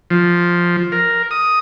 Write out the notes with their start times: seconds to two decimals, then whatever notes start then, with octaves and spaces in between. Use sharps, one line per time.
0.11 F3
0.92 A#4
1.31 D#6